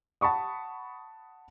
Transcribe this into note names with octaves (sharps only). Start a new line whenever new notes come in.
F#5 A5 B5 C#6 D#6